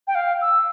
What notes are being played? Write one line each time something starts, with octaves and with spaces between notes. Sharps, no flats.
G5
F5
E6